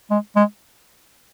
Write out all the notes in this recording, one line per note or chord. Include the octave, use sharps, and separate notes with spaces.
G#3
G#3